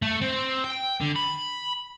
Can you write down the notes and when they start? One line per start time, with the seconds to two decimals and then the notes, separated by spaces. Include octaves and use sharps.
0.02 A3
0.22 C4
0.64 G5
1.01 D3
1.16 B5